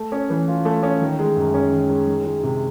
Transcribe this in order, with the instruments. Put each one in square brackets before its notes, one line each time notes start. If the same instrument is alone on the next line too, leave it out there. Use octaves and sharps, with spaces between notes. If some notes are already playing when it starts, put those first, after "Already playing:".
Already playing: [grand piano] A3
C#4
E3
F4
A3
C#4
D#3
G#3
F#2
C#4
D#3
G#3
D#3
G#3
C3